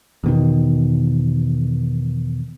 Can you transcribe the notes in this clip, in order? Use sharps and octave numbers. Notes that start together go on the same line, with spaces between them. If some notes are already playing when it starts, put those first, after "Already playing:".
E2 B2 D#3